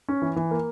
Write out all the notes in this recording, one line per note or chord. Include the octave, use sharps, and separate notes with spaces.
C#4
E3
E3
A#3